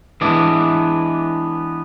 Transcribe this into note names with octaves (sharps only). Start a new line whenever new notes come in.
E3 G#3 B3 D4